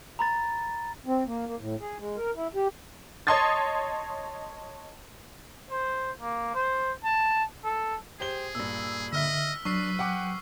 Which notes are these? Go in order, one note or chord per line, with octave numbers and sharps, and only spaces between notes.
A#5 B5 A6
C4
A#3
A#3
A2
G#4
G#3
A#4
E4
G4
C#5 D#5 A5 C6 D#6 A6
C5
A#3
C5
A5
A4
G4 G#4 C5 G7
G2 A#2 E6
D3 D#5 E5 E6 F6 B6
F#3 D4 B4 C#6 E6 C7
F#5 G5 D6